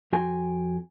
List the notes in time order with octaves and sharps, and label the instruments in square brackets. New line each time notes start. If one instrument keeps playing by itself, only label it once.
[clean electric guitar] F2 F#4 G5 G#5 C6